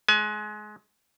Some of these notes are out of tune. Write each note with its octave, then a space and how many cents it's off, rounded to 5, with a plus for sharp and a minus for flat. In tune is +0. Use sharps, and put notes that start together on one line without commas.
G#3 +25 G#5 +30